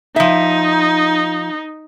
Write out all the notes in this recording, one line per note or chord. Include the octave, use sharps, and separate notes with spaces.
F3 D#4 E5